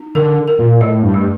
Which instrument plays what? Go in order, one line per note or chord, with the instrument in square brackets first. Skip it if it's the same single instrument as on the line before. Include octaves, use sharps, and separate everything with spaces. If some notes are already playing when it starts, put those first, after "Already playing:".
Already playing: [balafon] D#4
[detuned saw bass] D3 [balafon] A#4
[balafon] A#4
[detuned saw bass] A#2
[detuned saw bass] A2 [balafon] A3
[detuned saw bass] G2
[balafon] A3